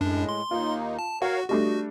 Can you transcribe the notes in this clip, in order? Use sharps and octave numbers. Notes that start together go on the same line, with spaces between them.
F#2 A2 G#3 D4
C6
D#2 A#3 D#4 F4
A5
F#4 A#4 C#5 F5 F#5
G3 A3 D4 F#4 D#5